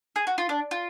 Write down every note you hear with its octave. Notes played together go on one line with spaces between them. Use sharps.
G#4
F#4
F4
D4
F4